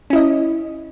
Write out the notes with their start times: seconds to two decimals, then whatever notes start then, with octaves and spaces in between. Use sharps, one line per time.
0.10 C#4
0.13 E4
0.16 D#5